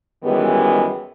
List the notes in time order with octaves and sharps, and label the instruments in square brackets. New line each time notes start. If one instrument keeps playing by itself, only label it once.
[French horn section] F#2 D#3 E3 G3 G#3 B3